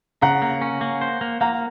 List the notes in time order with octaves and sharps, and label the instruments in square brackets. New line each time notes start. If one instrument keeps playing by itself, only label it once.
[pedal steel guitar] C#3 [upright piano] F#5 A#5
[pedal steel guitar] A#3
C#4
A#3
C5
A#3
[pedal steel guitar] A#3 [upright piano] F#5 A#5